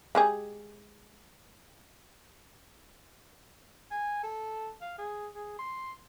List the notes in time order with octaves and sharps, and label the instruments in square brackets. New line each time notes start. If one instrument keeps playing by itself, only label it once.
[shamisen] G#3 G4 G#4
[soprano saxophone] G#5
A4
F5
G#4
G#4
C6